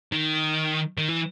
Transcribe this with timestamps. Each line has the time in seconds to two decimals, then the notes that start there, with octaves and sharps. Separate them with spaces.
0.12 D#3
0.98 D#3
1.09 E3